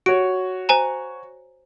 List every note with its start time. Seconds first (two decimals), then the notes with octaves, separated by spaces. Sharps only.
0.06 F#4 C#5 D7
0.69 C5 G#5 A#5